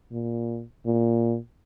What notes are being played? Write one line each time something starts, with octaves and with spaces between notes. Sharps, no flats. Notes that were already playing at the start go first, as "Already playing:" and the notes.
A#2
A#2